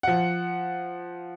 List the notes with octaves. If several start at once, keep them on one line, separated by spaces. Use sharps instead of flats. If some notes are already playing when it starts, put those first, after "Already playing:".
F3 F#5